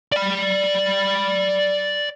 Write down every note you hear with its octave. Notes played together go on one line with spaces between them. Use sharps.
D5 B5